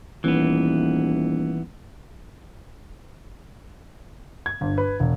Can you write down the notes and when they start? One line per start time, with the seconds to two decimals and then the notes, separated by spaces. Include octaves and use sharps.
0.24 D#1 E3 B3
4.46 G#6
4.61 G1
4.78 B4
5.00 E1